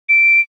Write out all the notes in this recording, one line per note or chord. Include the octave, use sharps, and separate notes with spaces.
D7